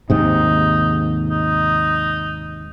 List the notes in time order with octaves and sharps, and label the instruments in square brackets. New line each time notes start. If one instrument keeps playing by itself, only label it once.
[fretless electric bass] D#2 G#2 C3 [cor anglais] D#4
[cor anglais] D#4